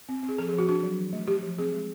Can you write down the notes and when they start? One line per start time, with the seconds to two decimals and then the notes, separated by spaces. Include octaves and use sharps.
0.09 C4
0.23 C4
0.29 G#4
0.38 F3 A4
0.49 G#4
0.53 F3
0.58 F#4
0.68 D4 F#4
0.83 F#3
0.98 E3
1.13 A3
1.27 A3 G4
1.42 F3
1.58 C4 G#4
1.73 G#3